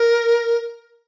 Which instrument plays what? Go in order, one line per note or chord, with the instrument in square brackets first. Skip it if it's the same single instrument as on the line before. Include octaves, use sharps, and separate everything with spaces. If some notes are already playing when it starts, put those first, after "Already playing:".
Already playing: [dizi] A#4